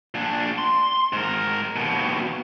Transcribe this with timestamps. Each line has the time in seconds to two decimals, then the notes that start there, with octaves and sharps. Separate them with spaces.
0.14 A#2 D4
0.58 C6
1.13 G#2 A#4
1.76 D#2 B2